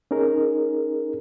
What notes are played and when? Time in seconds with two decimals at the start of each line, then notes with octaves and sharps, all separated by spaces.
0.11 C#4 D#4 G#4 A#4